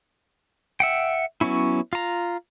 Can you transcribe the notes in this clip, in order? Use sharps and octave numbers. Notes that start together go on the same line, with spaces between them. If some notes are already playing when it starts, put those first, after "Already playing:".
E5 F#5 G5
F#3 B3 C#4 E4
F4 A#5